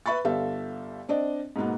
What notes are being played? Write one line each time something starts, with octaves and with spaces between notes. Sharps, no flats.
B4 E5 B5 C#6 A6
G1 G4 A4 E5 F5
C4 D4 D5 D#5
G#2 B2 A#3 B3